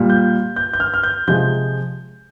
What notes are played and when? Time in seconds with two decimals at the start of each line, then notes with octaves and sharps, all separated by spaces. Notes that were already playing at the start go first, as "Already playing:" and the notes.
Already playing: A#2 G3
0.10 G6
0.56 G6
0.73 G6
0.80 F6
0.94 F6
1.03 G6
1.28 C3 F3 G#3 G6